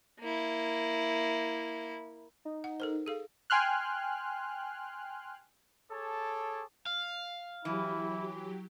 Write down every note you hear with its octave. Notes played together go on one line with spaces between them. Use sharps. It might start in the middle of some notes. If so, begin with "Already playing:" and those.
A#3 E4
D#4
F#5
A4 A#4 C5
G#4 A4 F5
G5 G#5 C6 F6 F#6
G#4 A4 C#5 A5 D6
F5
E3 F#3 E4 G4